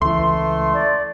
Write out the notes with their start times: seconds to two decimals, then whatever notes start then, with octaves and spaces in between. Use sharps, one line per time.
0.02 C#2 E3 A3 C6
0.74 D5